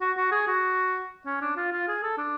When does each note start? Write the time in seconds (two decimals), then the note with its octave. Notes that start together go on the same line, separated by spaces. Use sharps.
0.01 F#4
0.17 F#4
0.31 G#4
0.47 F#4
1.26 C#4
1.41 D4
1.57 F4
1.72 F4
1.88 G#4
2.03 A4
2.17 D4